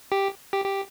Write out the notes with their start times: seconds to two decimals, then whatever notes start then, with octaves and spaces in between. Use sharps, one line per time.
0.12 G4
0.53 G4
0.65 G4